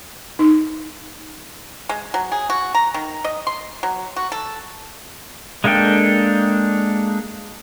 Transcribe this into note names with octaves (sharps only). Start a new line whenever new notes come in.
D#4
G#3
F#3
G#4
F#4
A#5
D#3
D#5
C6
F#3
F#4
A4
G#3 A#3 D4 A4 G5